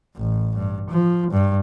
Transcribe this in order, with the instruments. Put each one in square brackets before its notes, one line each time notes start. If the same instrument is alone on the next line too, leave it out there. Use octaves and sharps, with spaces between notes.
[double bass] A1
G2
F3
G2